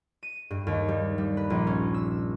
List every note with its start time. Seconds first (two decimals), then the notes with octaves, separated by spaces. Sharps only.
0.23 D#7
0.51 G2
0.67 D#2
0.88 G3
1.18 G3
1.37 B4
1.50 A#1
1.67 C#4
1.94 E6